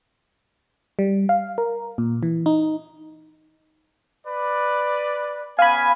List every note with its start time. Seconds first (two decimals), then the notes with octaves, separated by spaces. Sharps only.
0.99 G3
1.29 F5
1.58 A#4
1.98 A#2
2.23 E3
2.46 D#4
4.27 B4 D5
5.59 B3 C#4 F5 G#5 B5